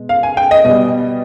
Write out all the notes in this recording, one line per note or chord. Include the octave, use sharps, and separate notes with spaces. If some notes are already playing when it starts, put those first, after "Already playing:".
Already playing: B2 G#3
F5
G#5
G5
D#5
B2 G3 D#5